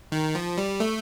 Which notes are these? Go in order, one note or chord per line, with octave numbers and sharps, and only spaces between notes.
D#3
F3
G3
A3